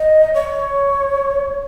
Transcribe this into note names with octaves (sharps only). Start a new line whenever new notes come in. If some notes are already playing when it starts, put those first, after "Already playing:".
Already playing: D#5
C#5